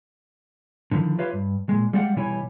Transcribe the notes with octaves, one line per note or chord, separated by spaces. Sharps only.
D3 D#3 F3 E4
F4 G4 B4 C#5 E5 F5
G2
A#2 G#3
G3 G#3 G4 D5 F5 F#5
B2 E3 G3 E4 C#5 G#5